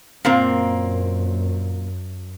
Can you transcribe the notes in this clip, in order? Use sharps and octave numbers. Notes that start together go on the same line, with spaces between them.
F#2 A#2 A#3 C4